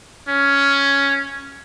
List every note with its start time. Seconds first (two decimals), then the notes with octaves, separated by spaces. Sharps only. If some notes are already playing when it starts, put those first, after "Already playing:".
0.28 C#4